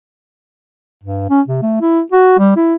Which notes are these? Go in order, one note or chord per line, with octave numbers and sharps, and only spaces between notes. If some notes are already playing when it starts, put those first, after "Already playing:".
G2
C#4
C3
A3
E4
F#4
G3
E4